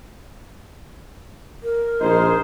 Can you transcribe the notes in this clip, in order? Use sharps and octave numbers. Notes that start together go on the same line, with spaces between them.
A#4
A#1 D#4 G#4 C5